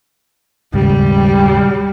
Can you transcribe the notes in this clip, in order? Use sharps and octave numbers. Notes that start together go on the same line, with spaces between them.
D#1 G#2 C#3 G3